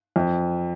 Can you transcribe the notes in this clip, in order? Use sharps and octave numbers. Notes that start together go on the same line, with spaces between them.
F2